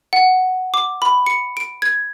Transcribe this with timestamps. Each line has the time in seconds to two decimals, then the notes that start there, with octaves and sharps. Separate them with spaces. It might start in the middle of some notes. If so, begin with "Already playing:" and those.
0.13 F#5
0.74 D6
1.02 B5
1.27 C#7
1.57 D7
1.82 G#6